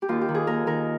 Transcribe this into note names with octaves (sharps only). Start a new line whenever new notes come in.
G4
D#2 F4
G4
D#3
G#4
D#2 A#4
D#3 A#4